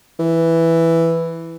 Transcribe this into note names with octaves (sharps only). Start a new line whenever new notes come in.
E3